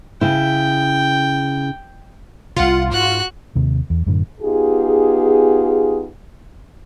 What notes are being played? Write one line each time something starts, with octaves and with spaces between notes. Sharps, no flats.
C#3 E4 G5
C2 C3 F4 F#5
G#2 F#4 F#6
D#2 C3
E2
F#2 A2 D3
B3 D#4 F4 G4 G#4